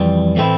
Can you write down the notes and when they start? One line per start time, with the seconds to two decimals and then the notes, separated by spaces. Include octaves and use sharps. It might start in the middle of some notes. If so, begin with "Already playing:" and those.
Already playing: F2 E3 G3
0.36 A2 E3 A3 C4 E4